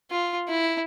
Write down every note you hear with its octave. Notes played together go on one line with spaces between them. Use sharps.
F4
E4